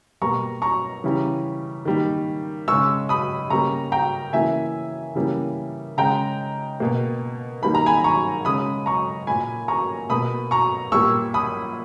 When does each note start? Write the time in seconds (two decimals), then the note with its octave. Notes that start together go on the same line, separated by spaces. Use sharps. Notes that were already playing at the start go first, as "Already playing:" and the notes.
0.22 B2 G3 A#3 A#5 C#6
0.62 A#5 C#6
1.04 C#3 E3 G3
1.85 D#3 G3 A#3
2.68 C#3 G#3 C#6 E6
3.09 B5 D#6
3.50 C#3 G3 A#3 A#5 C#6
3.92 G5 A#5
4.33 C#3 E3 A#3 E5 G#5
5.15 C#3 E3 G3 A#3
5.97 C#3 G#3 G5 A#5
6.80 B2 A#3
7.62 D#3 G3 A#3 B5
7.75 A#5
7.86 G#5 B5
8.04 A#5 C#6
8.45 C#3 G#3 B5 D#6
8.86 A#5 C#6
9.27 A#2 A#3 G#5 B5
9.68 A#5 C#6
10.09 B2 A#3 B5 D#6
10.51 A#5 C#6
10.92 A#2 G3 A#3 C#6 E6
11.34 B5 D#6